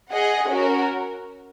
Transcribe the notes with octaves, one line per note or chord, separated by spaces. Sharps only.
G#4 D#5 F#5
C#4 F#4 A#4